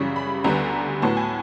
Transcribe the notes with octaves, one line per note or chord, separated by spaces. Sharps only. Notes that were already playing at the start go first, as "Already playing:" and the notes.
Already playing: F#2 C#3 E3 G3 C#6
B5
D2 D3 G3 B3 A#5
A2 F#3 B3 A5
G#5